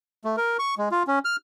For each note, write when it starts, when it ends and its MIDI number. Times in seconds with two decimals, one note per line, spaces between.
0.25 0.36 57
0.37 0.57 70
0.59 0.75 85
0.78 0.89 56
0.91 1.03 65
1.07 1.19 61
1.25 1.36 89